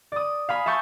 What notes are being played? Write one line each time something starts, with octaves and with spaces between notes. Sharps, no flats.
D5 D#6
F5 G#5 B5 D#6
E5 G#5 A5 C#6 G6